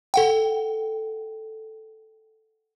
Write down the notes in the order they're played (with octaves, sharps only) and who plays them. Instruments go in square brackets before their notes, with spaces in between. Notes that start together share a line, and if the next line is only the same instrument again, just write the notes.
[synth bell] A4 F#5 G5